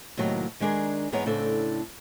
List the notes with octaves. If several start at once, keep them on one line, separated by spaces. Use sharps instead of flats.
D#2 A2 C3 D#3 F#3 A#5
D#3 G#3 D4 G#4 A#4
E2 G#2 G#3 B3 C#5 A#5
A2 C#3 C4 D4 A4